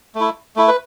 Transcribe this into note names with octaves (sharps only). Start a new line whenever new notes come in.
A3
E4
A3 E4
B4